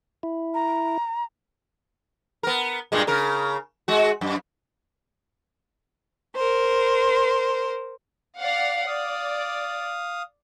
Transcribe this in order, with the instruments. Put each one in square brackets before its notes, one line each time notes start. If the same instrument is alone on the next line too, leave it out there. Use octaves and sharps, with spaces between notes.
[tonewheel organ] E4
[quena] A#5
[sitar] B3 A#4
G2 A#2 G#3
C#3 A#4
G#3 F#4
F#2
[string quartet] A#4 C5
[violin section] D5 F5 F#5
[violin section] D5 [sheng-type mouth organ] F5 D#6